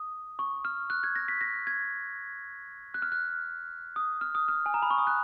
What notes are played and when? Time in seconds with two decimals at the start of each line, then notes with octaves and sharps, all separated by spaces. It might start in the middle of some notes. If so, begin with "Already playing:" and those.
Already playing: D#6
0.39 C#6
0.65 F6
0.90 F#6
1.03 G#6
1.16 A#6
1.28 B6
1.41 A#6
1.67 G#6
2.94 F#6
3.02 F6
3.12 F#6
3.96 D#6
4.21 F6
4.35 D#6
4.48 F6
4.66 G#5
4.74 A#5
4.82 B5
4.91 C#6
4.98 D#6
5.07 F#6